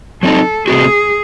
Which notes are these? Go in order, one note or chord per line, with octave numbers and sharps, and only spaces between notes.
F#3 C4 D#4 A4
C3 E3 A3 C4 F#4 G#4